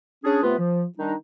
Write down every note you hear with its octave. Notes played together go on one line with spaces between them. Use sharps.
C#4 D4 G#4
C3 A3 B3 F4 B4
F3
D#3 G3 D4 D#4